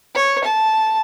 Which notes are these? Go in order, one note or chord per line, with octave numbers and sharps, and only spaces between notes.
C#5
A5